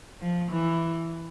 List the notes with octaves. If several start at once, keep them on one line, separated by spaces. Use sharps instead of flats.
F3
E3